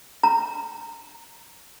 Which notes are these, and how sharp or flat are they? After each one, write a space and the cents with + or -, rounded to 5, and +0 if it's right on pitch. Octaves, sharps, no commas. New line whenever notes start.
A#5 -25